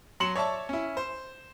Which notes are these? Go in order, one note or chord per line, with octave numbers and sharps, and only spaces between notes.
F#3 C6 C#7 E7 F#7
C#5 D5 E5 A5 C#6
C#4 E4
C5